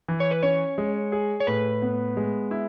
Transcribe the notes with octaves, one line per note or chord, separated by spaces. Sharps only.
E3
C#5
B4
C#4 C#5
G#3
G#4
C#5
A2 B4
B3
G#3
E4